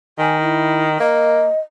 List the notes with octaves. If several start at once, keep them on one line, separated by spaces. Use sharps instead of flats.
D#3 G#5
E4
A#3 D#5